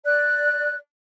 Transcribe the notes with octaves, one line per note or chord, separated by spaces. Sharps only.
D5 F#6